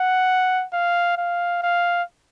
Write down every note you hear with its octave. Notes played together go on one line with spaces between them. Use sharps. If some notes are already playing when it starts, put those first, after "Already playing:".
Already playing: F#5
F5
F5
F5